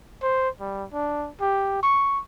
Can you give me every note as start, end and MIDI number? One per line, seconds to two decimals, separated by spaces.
0.23 0.49 72
0.60 0.84 55
0.93 1.30 62
1.41 1.81 67
1.83 2.20 85